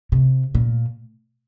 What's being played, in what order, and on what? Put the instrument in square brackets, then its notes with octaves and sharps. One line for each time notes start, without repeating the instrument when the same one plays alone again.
[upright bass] C3
A#2